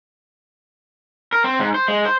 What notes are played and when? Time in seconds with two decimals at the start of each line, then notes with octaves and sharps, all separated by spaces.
1.33 A#4
1.44 C4
1.60 G#2
1.74 C5
1.88 G#3
2.05 C5